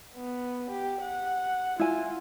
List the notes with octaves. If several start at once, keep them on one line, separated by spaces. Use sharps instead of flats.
B3
G4
F#5
E4 F4 G#5